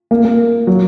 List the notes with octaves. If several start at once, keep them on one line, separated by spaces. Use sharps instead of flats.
A#3
A#3
F#3